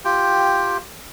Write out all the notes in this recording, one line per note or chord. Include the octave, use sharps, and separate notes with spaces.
F4 G4 G5